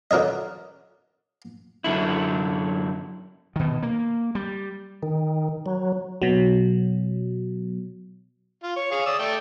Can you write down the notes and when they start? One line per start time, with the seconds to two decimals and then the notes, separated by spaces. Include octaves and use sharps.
0.11 D3 F#4 A#4 C#5 D#5
1.84 F#2 D3 E4
3.56 B2 D#3
3.83 A#3
4.35 G3
5.03 D#3
5.66 F#3
6.22 B2 F#3
8.64 F4
8.76 C#5
8.91 G#4 C#5 F5
9.06 D5 D#6 E6
9.19 A3 D5 G5